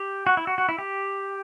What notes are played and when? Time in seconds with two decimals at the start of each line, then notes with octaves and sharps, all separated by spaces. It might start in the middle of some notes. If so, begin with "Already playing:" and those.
Already playing: G4
0.27 F#4
0.37 E4
0.47 F#4
0.58 F#4
0.69 E4
0.78 G4